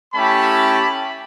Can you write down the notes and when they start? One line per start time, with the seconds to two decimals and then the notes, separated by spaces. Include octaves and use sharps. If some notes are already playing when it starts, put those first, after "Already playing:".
0.14 A3 C#4 E4 G4 A5 B5